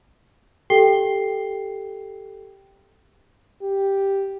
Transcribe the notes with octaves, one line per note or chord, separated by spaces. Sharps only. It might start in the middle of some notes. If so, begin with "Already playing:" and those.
G4 A4 G5 C7 G7
G4